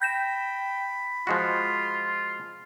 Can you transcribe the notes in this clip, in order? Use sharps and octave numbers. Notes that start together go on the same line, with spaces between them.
G5 B5 G6 A#6 E7
F3 G#3 F4 F#4